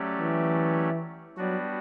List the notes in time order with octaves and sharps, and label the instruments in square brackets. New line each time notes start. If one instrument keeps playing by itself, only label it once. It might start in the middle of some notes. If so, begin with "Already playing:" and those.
Already playing: [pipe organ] F#3 A3 C#4 G4 D5
[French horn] E3
[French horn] F#3 [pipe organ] G3 B3 D4 F#4